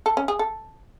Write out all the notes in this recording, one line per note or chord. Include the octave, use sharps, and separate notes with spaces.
A4
C#4
G#4
A4